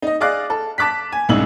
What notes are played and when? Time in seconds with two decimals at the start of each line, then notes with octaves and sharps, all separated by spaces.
0.02 D#4 D#5
0.20 G#4 D5 D#5 F5 D6 F#6
0.50 A4
0.78 A5 D6 F#6 B6
1.12 G#5
1.29 C2 G#2 C#3 D#4 E6 F#7